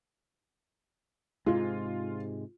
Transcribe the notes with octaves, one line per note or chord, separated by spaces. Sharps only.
G#2 C3 G#3 F4